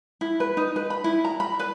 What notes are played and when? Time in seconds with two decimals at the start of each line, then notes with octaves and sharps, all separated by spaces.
0.21 E4
0.40 B4
0.57 D#4
0.76 B4
0.90 B5
1.04 E4
1.25 A#5
1.40 B5
1.59 B4